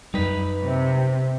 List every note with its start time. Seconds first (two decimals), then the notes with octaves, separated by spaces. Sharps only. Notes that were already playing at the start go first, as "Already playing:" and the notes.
0.14 F#2 G3 D#4 B4
0.63 C3